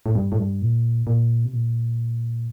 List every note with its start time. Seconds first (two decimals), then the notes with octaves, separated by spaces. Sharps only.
0.06 A2
0.15 G2
0.32 A2
0.38 G2
0.62 A#2
1.07 A#2
1.45 C3
1.53 A#2